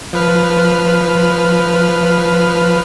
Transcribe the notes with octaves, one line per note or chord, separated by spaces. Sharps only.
F3 B4 F6